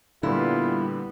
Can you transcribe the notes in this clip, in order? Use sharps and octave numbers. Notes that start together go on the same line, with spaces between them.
A#2 D3 G3 B3 E4 F4